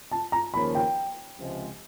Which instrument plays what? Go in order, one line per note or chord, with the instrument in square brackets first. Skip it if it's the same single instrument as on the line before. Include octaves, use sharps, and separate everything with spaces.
[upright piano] A5
A#5
[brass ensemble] D#2 C#3 F3 A#3 C#4 [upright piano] B5
[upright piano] G5
[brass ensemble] C#2 C3 F3 G#3